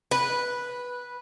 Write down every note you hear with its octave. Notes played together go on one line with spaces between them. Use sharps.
B4